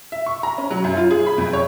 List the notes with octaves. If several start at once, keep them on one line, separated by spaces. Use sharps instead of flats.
E5
C#6
A#5
C#4
F#3
F#2
F4
G#4
B5
F2
C#5